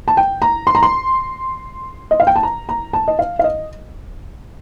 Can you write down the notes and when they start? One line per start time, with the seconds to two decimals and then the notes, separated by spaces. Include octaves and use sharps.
0.08 A5
0.17 G5
0.42 A#5
0.67 C6
0.75 A#5
0.83 C6
2.11 D#5
2.20 F5
2.27 G5
2.36 A5
2.43 A#5
2.69 A#5
2.93 A5
3.08 D#5
3.19 F5
3.39 F5
3.44 D#5